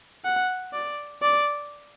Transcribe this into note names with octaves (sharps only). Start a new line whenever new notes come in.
F#5
D5
D5